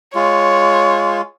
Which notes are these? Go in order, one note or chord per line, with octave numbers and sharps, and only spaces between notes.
G#3 F4 C#5